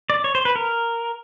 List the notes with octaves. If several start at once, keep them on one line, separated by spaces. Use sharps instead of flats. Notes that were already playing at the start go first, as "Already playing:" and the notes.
D5
C#5
C5
B4
A#4